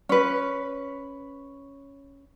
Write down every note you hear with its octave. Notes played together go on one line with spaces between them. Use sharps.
C#4 B4